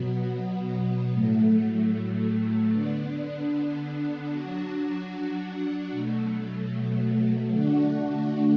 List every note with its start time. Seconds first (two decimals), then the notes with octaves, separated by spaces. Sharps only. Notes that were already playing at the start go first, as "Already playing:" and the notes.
Already playing: B2 F#3 B3
1.13 A2 F#3 A3
2.72 D3 B3 D4
4.31 F#3 D4 F#4
5.91 B2 F#3 A3
7.51 D3 A3 D4 F#4